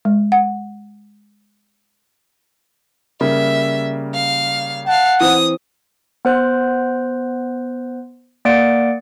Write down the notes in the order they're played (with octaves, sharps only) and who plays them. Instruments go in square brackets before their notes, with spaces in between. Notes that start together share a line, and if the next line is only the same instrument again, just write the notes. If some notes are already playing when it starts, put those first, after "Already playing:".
[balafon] G#3
F#5
[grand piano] C#3 G3 A#3 [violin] E5
[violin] F5
[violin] F5 A5 [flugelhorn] F#5
[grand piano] E3 C4 C5 [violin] D#6
[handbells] B3 C5 F#6
A#3 D5 F#5 D7